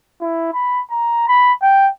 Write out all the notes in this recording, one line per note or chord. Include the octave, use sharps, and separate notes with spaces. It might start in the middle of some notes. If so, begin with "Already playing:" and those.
E4
B5
A#5
B5
G5